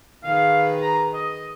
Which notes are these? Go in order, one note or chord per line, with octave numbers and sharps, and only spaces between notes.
D#3 G#4 B4 F5
A#5
D#5